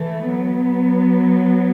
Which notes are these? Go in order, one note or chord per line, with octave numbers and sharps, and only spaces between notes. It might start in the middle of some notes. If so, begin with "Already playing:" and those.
Already playing: E3 A3
F#3 B3